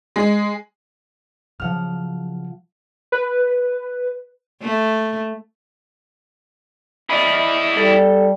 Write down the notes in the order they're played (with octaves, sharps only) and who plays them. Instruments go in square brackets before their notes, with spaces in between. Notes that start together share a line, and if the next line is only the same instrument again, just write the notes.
[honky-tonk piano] G#3
[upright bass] C#3 F#3 [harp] F3 F#5 F6
[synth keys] B4
[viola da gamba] A3
[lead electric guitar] E4 G#4 [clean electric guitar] D5 D#5 B5
[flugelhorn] G3 [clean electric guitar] A4